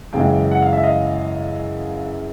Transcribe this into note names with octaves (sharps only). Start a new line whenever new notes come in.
F#2 C#3 E3 G#3 F5 G5
F#5
F5
E5
D#5 F5